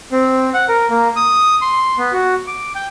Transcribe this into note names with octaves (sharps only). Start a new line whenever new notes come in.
C4
F#5
A#4
A#3
D#6
C6
B3
F#4
D6
G5